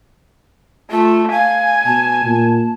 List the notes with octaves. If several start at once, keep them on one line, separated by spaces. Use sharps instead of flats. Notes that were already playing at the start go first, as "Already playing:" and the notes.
A3 F4
F5 G#5
B2 A5
A#2